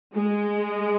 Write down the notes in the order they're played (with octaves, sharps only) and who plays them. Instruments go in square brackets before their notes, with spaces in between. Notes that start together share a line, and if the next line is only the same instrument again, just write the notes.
[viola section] G#3